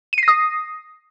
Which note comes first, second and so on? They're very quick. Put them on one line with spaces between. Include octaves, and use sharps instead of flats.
D#7 C7 A#6 D#6